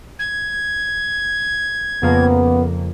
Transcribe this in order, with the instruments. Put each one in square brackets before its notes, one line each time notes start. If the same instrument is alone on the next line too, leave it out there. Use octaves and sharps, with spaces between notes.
[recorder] G#6
[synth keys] F2 C#3 A#3 [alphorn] B3